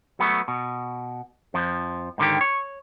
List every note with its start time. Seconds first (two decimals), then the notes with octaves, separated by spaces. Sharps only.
0.19 F#3 A3 B3
0.48 B2
1.54 F2 F3
2.18 G#2 D3 D#3 G4
2.41 C#5